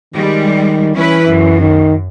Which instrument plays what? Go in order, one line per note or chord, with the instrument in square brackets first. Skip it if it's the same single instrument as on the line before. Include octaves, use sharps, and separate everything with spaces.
[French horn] D#3 [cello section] G3 G#3
[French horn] E3 [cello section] C#4 E4 B4
[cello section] F#2
[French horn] D#3